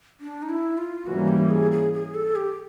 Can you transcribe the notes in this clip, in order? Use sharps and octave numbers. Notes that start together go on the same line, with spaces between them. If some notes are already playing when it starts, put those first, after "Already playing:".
D4
D#4
E4
F4
G#2 E3 G3 A#3 C#4 F#4
G4
G#4
G#4
G#4
A4
G4